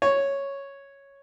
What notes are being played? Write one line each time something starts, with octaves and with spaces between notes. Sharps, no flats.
C#5